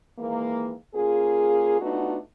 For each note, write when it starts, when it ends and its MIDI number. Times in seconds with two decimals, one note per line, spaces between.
0.18 0.74 51
0.18 0.74 52
0.18 0.74 56
0.18 0.74 58
0.94 1.79 49
0.94 1.79 58
0.94 1.79 65
0.94 1.79 68
1.81 2.17 57
1.81 2.17 59
1.81 2.17 62
1.81 2.17 63
1.81 2.17 65
1.81 2.17 66